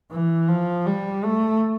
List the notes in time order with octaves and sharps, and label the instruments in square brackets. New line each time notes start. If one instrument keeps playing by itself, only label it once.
[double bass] E3
F3
G3
A3